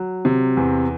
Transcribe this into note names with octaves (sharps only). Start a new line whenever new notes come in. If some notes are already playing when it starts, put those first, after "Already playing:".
Already playing: F#3
C3
E2